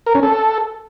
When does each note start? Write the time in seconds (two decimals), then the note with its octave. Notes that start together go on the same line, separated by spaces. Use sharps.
0.06 A#4
0.15 C#4
0.23 A4